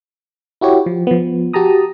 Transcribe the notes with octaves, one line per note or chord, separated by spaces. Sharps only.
E4 F#4 G4 C#5
F3
F3 B3
F#4 G4 A5 A#5 D#6